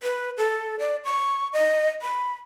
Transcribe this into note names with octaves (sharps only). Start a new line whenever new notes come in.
B4
A4
D5
C#6
D#5
B5